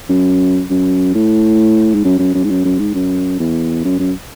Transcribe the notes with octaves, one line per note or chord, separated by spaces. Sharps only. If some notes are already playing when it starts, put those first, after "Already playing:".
F#2
F#2
A2
G#2
F#2
F#2
F#2
G#2
F#2
F#2
G#2
F#2
E2
F#2
F#2